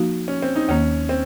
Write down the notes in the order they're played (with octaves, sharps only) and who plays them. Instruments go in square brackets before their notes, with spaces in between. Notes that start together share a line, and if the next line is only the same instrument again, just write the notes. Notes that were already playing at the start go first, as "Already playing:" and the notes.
Already playing: [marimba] F3 A#3 D#4 F#4
[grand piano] C#4
C4
D#4
[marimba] D#2 D#3 A#3 [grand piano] C#4
[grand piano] C4